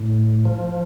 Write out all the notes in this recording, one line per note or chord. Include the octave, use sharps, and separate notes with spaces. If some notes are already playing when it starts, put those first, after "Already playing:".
Already playing: A2
F3